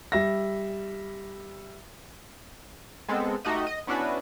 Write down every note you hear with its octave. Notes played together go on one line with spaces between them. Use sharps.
G3 E5 A#6
G#3 B3 C4 A4
A3 D#4 F#4 G4 D#5
D#5
B3 C#4 D4 E4 F#4 B4